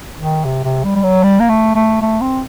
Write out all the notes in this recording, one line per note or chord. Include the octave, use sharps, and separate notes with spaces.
D#3
C3
C3
G3
G3
F#3
G3
A#3
A3
A3
A3
C4